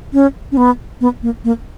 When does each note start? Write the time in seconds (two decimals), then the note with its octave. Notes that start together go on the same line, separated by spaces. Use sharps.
0.13 C#4
0.52 C#4
0.57 B3
1.01 B3
1.23 A#3
1.44 A#3